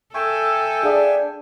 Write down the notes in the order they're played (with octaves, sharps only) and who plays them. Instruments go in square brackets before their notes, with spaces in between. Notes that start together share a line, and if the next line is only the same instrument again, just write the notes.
[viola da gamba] A4 [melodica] E5 G5 G#5 [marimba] C#6
[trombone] D4 [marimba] G#4 F5 D#6